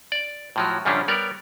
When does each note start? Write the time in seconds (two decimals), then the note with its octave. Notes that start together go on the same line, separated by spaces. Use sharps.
0.12 D5
0.56 A2 F3 F#3
0.85 F#2 C#3 F3 G3 C#4 D4
1.08 G3 B3 A#4 C#5 D5